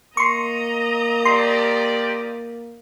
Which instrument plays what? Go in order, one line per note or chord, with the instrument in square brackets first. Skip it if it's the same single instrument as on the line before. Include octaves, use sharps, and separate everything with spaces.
[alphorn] A#3 [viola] D#5 A#5 [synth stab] C6 C#6
[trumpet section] F4 G4 D5 [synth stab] C6